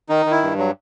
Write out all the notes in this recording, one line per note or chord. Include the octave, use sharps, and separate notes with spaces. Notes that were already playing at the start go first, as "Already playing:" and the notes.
D#3 D#4
D#3
E4
G2
F#3